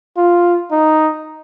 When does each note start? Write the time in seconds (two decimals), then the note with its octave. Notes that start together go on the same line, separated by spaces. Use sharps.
0.17 F4
0.71 D#4